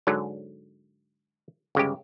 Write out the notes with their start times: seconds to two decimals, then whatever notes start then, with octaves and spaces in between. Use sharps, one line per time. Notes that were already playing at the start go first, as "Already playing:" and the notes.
0.07 G#2 D3 F#3
1.75 G1 C#3 G#3 G4